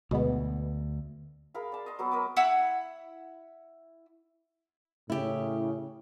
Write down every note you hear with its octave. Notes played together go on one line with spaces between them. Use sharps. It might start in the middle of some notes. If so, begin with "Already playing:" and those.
D2 B2 G#3 B3
G#4 A#4 F5 B5
D5 A5
D#5 C6
F#3 B3 F#4 A4
A#4 D#5 B5 D6
E4 F#5 B5 E6
A2 C#3 E4 G4